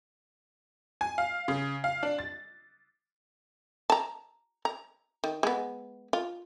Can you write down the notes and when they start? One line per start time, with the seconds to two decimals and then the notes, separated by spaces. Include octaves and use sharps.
1.01 G#5
1.18 F5
1.48 C#3
1.84 F5
2.03 D4
2.19 A6
3.90 A5 A#5
4.65 A#5
5.24 D#3
5.43 G#3 B3
6.13 F4